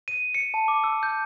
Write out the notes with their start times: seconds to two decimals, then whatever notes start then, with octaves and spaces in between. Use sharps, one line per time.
0.08 D#7
0.34 C#7
0.54 A5
0.68 D6
0.84 E6
1.03 G6